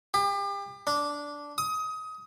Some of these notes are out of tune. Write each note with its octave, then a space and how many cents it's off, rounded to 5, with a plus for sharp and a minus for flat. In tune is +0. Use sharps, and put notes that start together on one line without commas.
G4 +35
D4 -10
D#6 +20